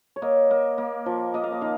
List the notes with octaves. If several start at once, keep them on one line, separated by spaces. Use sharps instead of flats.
C#5
A#3 D#5
A#3
A#3
F3
A#3 D#5
F5
D#5
D#3 F5